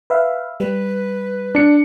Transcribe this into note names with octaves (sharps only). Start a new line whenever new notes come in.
B4 E5 F5
G3 B4
D4 C#7